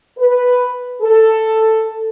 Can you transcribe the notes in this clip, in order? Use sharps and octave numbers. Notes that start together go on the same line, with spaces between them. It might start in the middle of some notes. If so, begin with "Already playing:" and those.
B4
A4